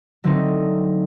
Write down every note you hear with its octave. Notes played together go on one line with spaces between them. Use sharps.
D3 F#3 A3 C4 D#4